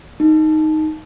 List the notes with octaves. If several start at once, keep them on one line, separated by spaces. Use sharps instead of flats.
D#4